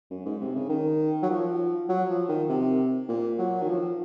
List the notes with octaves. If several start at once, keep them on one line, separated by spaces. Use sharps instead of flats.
F#2
G#2
C3
C#3
D#3
F#3
F3
F#3
F3
D#3
C3
A#2
F#3
D#3
F3